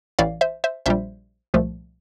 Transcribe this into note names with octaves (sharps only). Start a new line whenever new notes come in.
A1 A2 E3 D5 F5
C5 E5
C5 E5
A#1 A#2 G3 C5 E5
C2 A#2 F3 A3